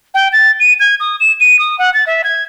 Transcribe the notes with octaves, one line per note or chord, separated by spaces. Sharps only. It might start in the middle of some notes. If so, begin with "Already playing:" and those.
G5
A6
D#7
G#6
D#6
E7
D#7
D#6
F#5
A6
E5
G#6